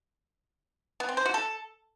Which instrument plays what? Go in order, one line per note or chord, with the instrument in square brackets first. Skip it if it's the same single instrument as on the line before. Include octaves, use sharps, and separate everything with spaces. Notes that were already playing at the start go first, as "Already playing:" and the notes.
[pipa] B3
C4
C5
F#4
A4